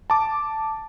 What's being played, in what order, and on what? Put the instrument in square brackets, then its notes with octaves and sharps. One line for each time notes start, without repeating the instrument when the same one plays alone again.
[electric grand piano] A5 D6